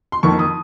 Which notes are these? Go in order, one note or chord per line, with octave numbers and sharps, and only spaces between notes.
C6
F2 D#3 A#3 C#6
D#6